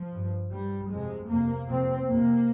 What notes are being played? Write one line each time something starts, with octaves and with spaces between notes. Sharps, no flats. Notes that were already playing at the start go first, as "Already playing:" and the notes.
Already playing: F3
G2
G2 G3
F2 C3 G#3
F2 C3 A#3
F2 C3 C4
F2 C3 A#3